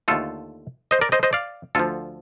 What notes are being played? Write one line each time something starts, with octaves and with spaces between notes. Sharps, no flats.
D#2 D3 A3 F4 A4
C5 D#5
A#4 D5
C5 D#5
C5 D#5
D5 F5
D2 D3 F3 F4 A4